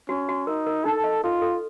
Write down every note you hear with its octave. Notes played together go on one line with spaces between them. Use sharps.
C#4 F#4
F#4
D#4 A#4
A#4
D#4 A4
D#5
F4 A4
A4